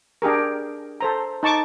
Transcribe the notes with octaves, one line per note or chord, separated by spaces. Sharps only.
D4 G4 G#4 A#4
A4 C5 A#5
D#4 A5 C#6 D6